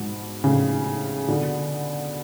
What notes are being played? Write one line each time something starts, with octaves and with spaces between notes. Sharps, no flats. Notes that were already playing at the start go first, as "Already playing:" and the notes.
Already playing: G#2 B2
A2 C#3
B2 D3